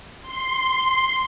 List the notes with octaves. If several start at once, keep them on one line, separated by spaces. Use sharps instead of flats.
C6